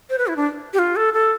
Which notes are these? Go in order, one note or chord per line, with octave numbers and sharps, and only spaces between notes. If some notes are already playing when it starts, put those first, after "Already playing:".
C5
B4
E4
D4
G4
F4
A4
A4